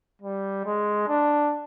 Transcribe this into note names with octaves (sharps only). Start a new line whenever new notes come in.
G3
G#3
D4